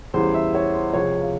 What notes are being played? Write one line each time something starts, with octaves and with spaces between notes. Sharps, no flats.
E2 C#3 E3 G3 C5
E5
C#5
C5
C#2 C3 F3 G#3 C#5
F5